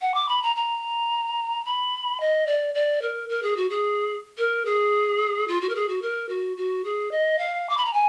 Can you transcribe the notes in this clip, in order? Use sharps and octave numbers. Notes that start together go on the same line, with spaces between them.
F#5
D6
B5
A#5
A#5
B5
D#5
D5
D5
A#4
A#4
G#4
F#4
G#4
A#4
G#4
F4
F#4
A#4
G#4
F#4
A#4
F#4
F#4
G#4
D#5
F5
D6
B5
A#5
G#5